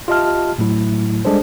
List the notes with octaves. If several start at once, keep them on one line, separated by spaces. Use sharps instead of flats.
F4 G4 D#5 E5 A5 F6
A2 F#3 A3 E4
G3 G#3 D4 G#4 A4 C5